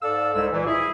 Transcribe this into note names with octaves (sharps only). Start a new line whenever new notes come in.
G#2 A4 D5 F5 E6
C2 G#2 G#3 E6
A#2 E3
E4 G#4